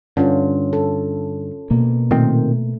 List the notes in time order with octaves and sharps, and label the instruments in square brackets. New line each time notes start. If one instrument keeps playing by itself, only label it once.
[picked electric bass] G2 D3 [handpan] C#4 F4
[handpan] A4
[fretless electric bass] B2 A#3
[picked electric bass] A#2 D#3 C4 [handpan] A3